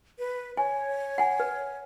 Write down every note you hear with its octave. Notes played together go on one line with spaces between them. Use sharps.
B4
C#5 G#5
F#5 G#5
B4